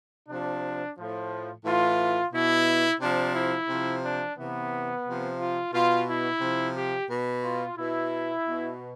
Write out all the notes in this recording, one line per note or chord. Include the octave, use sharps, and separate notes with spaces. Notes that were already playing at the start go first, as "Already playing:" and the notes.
C3 F3 D4
A2 F3
A2 E3 F4
B2 E4
C3 F3 D4
E4
C3 F3
D4
C3 E3 B3
C3 F3
F4
B2 F4
E4
C3 F3
G4
B2
F4
B2 E4
B2